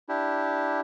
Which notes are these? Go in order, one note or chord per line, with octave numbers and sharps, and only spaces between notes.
D4 E4 G4